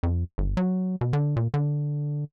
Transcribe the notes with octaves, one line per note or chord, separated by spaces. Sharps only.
F2
G1
F#3
B2
D3
A#2
D3